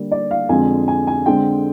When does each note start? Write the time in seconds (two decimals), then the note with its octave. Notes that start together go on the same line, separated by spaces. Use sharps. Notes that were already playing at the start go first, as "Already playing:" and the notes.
Already playing: D3 G3 A#3
0.11 D5
0.31 F5
0.49 F2 D3 G#3 C4 G#5
0.88 G#5
1.07 G#5
1.26 D3 G#3 C4 G5